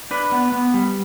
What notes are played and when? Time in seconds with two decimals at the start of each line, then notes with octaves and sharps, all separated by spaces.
0.11 D4 B4
0.32 B3
0.52 B3
0.74 G3